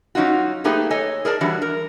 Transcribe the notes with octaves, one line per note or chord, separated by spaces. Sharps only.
F#3 C#4 D#4 F4 F#4
A3 A#3 D#4 G4 G#4 B4
A4 C#5 D#5 G#5
G#4 A#4 D5 A5
E3 F#3 G3 D4
A#4